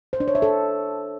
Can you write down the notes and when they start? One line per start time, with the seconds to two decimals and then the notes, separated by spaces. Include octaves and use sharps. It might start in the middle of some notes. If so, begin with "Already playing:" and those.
0.13 C5
0.20 D4
0.28 C#5
0.35 E5
0.42 A4